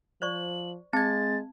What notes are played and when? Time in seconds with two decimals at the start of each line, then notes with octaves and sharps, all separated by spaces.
0.22 F3 C5 D5 C#6 F#7
0.93 G#3 C4 A5 G#6 A6